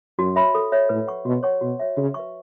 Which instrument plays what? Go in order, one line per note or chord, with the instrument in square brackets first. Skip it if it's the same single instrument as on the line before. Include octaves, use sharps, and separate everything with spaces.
[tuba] F#2 [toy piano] F#4
[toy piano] C#5 E5 B5
A4
C#5 E5
[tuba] A2 [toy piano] B4
[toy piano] F#5 C#6
[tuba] B2 [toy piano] F#4
[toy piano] C#5 F#5 C#6
[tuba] B2 [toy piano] F#4
[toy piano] C#5 E5
[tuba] C#3 [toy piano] F#4
[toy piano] B4 E5 C#6